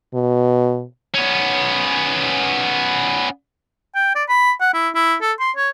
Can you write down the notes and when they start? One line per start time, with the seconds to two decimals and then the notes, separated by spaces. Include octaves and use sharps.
0.14 B2
1.15 B3 C#4
3.95 G5
4.15 D5
4.29 B5
4.61 F#5
4.74 E4
4.95 E4
5.21 A4
5.40 C6
5.56 C#5